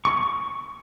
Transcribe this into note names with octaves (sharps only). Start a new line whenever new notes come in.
C#6